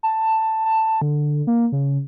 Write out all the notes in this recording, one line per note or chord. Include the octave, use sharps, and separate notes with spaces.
A5
A5
D3
A#3
C#3